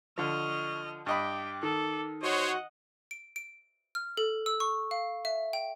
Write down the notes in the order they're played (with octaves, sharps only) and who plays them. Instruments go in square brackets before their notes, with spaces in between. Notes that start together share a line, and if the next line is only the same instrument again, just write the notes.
[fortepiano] D3 F3 [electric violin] D#5 F6 [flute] C#6
[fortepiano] G2 D#5 B5 [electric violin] G5 [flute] D6
[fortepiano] D#3 [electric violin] A4
[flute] F#4 [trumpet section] C5 C#5 [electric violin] D#5 F#5
[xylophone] D7
D7
F6
A4
E6
C#6
F5
E5
G5